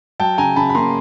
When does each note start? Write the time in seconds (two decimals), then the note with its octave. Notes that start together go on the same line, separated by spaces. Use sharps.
0.20 F#3 G5 A5
0.38 C#3 G#5 A#5
0.56 C#3 A5 B5
0.70 B5
0.75 A#3 A#5 C6